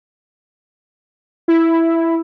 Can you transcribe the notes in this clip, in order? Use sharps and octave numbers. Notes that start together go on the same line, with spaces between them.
E4